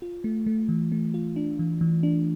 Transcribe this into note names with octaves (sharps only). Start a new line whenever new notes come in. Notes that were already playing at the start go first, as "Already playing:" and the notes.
F4
A3
A3
E3
A3
F4
D4
E3
E3
D4